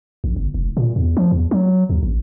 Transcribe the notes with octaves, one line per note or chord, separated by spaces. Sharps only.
A#1
G1
F1
A#2
E2
F3
E2
F#3
D#2
A1